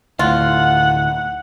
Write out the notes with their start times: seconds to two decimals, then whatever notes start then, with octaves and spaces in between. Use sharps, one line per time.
0.19 D2 A2 F4 F#5